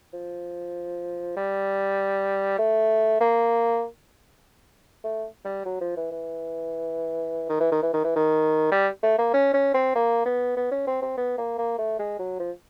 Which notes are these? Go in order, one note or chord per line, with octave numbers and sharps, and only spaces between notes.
F3
G3
A3
A#3
A3
G3
F#3
F3
E3
E3
D#3
E3
D#3
E3
D#3
E3
D#3
G3
A3
A#3
C#4
C#4
C4
A#3
B3
B3
C#4
C4
C4
B3
A#3
A#3
A3
G#3
F#3
F3